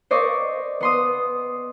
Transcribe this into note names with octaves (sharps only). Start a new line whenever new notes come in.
C5 D5 D#5 C#6
B3 C6 D#6